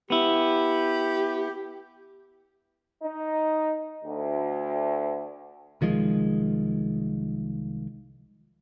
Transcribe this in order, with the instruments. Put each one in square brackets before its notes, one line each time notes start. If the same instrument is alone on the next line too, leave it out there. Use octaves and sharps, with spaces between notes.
[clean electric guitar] B3 E4 [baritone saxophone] G4
[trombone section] D#4
D2
[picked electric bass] C2 D#3 F3 G#3